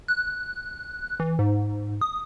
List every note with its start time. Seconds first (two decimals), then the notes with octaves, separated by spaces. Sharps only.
0.08 F#6
1.20 E3
1.39 G#2
2.01 D#6